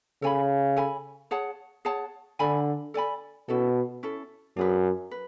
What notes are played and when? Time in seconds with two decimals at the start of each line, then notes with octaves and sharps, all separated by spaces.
0.22 C#3 A4 C#5 G#5 B5
0.76 A4 C#5 G#5 B5
1.31 G#4 C#5 F#5 A5
1.85 G#4 C#5 F#5 A5
2.39 D3 A4 D5 G#5 B5
2.94 A4 D5 G#5 B5
3.48 B2 C#4 E4 A4
4.03 C#4 E4 A4
4.57 F#2 D4 G#4 B4
5.11 B4